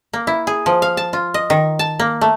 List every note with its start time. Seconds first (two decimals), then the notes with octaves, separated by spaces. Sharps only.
0.13 A#3
0.27 E4
0.47 G#4
0.66 F3
0.82 F5
0.97 A5
1.13 F4
1.34 D#5
1.50 D#3
1.79 A5
1.99 A#3
2.21 A3